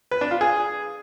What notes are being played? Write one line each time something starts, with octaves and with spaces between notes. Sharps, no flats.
B4
D4
F4
G#4